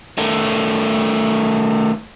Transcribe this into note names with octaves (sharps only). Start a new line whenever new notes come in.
D#3 A3